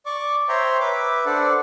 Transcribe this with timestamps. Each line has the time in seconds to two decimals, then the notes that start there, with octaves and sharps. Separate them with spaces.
0.06 D5 C#6 D6
0.49 C5 C#5 E5 G5 A#5 C6
0.80 B4 E5 D6
1.26 D4 A4 C5 D5 F#5